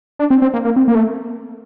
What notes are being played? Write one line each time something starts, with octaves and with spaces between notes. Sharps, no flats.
D4
C4
C4
A#3
A#3
C4
A#3
A3